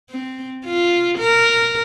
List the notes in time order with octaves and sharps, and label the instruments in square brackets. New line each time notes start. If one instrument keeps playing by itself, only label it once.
[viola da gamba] C4
F4
A#4